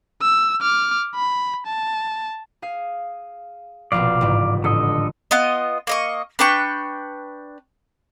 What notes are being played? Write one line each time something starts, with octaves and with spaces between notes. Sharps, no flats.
E6
D6 F6
B5
A5
G#4 F5
F1 A#1 B2 D5 F5
A1 G#2 C#3
A2 D3 A4 D#5
B3 F4 D#5
A#3 D#5 C#6
D4 B4 G5 C#6